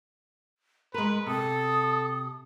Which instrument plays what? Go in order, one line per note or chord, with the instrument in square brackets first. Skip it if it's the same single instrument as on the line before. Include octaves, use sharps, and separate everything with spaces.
[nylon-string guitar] G#3 A#4 [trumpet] B4 [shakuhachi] C6
[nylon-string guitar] C3 [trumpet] A4 [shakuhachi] D#6